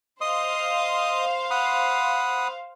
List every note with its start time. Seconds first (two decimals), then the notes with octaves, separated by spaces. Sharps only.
0.21 C5 D#5 F5 C6 D#6
1.51 F#5 B5 D#6